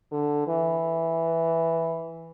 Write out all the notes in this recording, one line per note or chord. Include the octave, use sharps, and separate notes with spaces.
D3
E3